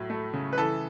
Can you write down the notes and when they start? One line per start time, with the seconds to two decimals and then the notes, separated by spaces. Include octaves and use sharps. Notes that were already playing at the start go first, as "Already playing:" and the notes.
Already playing: A2 F#3
0.10 A3
0.33 C#3
0.53 B4
0.58 E3 A4